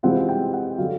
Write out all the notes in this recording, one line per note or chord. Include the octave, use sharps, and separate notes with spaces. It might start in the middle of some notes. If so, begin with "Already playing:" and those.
C3 E3 G#3 C4 F4 F#5
F#5
G5
F#5
D3 F#3 F5